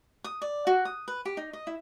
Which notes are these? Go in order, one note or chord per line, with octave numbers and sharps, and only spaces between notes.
D#6
D5
F#4
D#6
B4
G4
D#4
D#5
E4